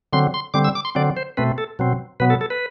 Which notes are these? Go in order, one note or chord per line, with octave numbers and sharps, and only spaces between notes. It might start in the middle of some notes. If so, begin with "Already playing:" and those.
D3 F#3 C4 C6
C6
D3 G3 C4 D6
E6
D6
C6
D3 F#3 C4 D5
C5
B2 A3 C4 B4
A4
B2 F#3 C4
B2 F#3 B3 B4
A4
A4
B4